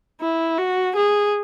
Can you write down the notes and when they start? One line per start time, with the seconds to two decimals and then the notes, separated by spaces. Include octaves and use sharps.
0.21 E4
0.58 F#4
0.96 G#4